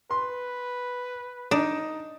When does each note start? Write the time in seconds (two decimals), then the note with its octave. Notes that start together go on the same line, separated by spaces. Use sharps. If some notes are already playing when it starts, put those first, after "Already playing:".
0.11 B4 C6
1.51 D4 D#4